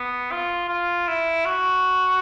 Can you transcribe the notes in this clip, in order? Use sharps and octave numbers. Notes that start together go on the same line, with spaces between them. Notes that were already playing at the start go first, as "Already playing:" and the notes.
Already playing: B3
F4
F4
E4
F#4